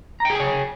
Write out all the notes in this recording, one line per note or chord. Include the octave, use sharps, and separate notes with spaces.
G#4 C#5 G5 G#5 A#5